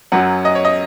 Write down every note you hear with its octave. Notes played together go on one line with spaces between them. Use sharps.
F#2 F#3 C#4 F#5
D#5
C#5
D#5